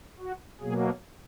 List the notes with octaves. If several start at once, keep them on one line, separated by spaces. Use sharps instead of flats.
F#4
B2 F#3 A#3 G#4